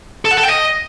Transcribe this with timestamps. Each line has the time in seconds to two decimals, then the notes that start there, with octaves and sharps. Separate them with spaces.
0.25 A4
0.31 F#5
0.37 A4
0.43 G5
0.49 D#5